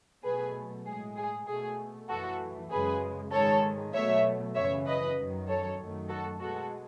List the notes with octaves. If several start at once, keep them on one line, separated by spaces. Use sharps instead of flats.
B2 F#3 A3 G#4 B4
A2 G#3 G#4
G#4
B2 A3 G#4
F#2 E3 A3 F#4 A4
F#2 C#3 G#3 G#4 B4
G#2 D#3 G#3 A4 C#5
B2 F#3 A3 C#5 E5
F#2 C#3 E3 C#5 E5
B4 D#5
F#2 D#3 F#3
A4 C#5
F#2 D#3 F#3 A3
F#4 A4
B2 G#3 F#4 A4